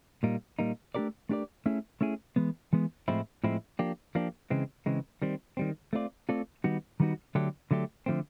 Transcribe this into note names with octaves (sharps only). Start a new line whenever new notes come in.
A#2 G3 A#3 D#4
A#2 G3 A#3 D#4
A3 D4 G4 A#4 D5
A3 D4 G4 A#4 D5
A3 C#4 E4 G#4
A3 C#4 E4 G#4
E3 G#3 B3
E3 G#3 B3
A2 F3 G#3 C4 E4
A2 F3 G#3 C4 E4
F3 A#3 D4 G4
F3 A#3 D4 G4
C#3 E3 G#3 C4
C#3 E3 G#3 C4
D#3 G3 C4
D#3 G3 C4
A3 C4 F4 A4 D5
A3 C4 F4 A4 D5
D#3 G3 B3 D#4 F#4
D#3 G3 B3 D#4 F#4
D3 F#3 A3 D4 G4
D3 F#3 A3 D4 G4
D3 F3 A3 C4